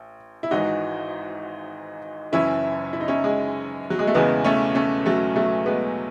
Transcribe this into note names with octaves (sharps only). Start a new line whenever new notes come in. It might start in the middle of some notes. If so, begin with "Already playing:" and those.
Already playing: A1
E4
G#1 G#2 E3 D#4 F#4
F#1 F#2 E3 C#4 E4
E4
D#4
C#4 E4
G#3
F#3
G#3
A3
E1 E2 C#3 E3 G#3 B3
A3 C#4
A3 C#4
F#3 A3
F#3 A3
G#3 B3